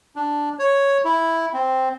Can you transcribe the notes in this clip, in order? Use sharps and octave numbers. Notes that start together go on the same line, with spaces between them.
D4
C#5
E4
C4